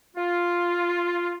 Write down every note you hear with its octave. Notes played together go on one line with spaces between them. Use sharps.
F4